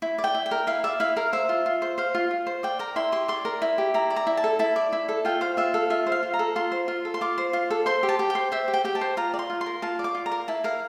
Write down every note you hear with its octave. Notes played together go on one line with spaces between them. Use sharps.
E4
D5
G5
E4
G5
A#4
E4 F5
D5 E5
E4 F5
A#4 F5
C5 E5
F4
F4
C5
C5 F5
F4
F4
C5
D5 G5
A#4 A#5
E4 C6
G4 C6
D5 C6
A#4
E4
G4
E4 A#5
D5
A#5
E4
A5
A4
E4 A5
D5
E4
A4
F4 G5
C5 F5
F4 E5
A4 F5
F4 E5
C5
F5
F4
A#5
A4
F4 C6
C5
F4
A4
C6
F4 D6
C5
F4
A4
C5 C6
G4
A5
G4
G5
C5
C5 E5
G4
G5
G4 G5
A5
C5
F4 A#5
D5
C6
F4
C6
A#4
F4 A5
D5
D6
F4
A#5
A#4
E4 A5
A#4 F5